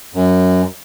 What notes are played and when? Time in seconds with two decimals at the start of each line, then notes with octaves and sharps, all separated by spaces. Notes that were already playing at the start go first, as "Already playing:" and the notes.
0.14 F#2